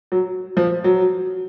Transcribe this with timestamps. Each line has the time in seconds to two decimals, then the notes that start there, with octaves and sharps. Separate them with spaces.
0.12 F#3
0.57 F3
0.84 F#3